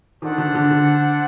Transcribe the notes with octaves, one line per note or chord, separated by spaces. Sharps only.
D#3 D4 A4 C5 F#5
D3
D3
D3